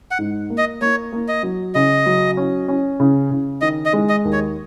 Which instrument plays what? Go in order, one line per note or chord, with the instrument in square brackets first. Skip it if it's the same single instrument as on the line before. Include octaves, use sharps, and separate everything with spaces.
[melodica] F#5
[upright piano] G#2
A#3
[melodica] D#5
[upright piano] A#3 [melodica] C#5
[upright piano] A#3
[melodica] D#5
[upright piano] F#3
[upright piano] C#3 [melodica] D#5
[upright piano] F#3
C#4
C#4
C#3
C#3
[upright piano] D#3 [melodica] D#5
[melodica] D#5
[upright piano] G#3
[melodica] D#5
[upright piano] D#2
[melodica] C#5